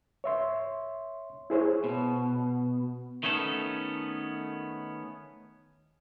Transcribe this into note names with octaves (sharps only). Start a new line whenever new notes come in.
C#5 E5 C6
E4 G#4 C5 C#5
B2
D#3 A3 B3 C#4 A4